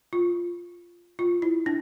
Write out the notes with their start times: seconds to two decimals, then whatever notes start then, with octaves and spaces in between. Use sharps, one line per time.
0.13 F4
1.19 F4
1.42 E4
1.66 D4